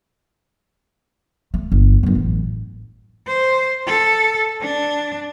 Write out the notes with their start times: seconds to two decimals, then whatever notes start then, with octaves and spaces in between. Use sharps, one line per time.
1.54 A3
1.72 G1
2.03 G1 F#2
2.15 A1
3.27 C5
3.86 A4
4.62 D4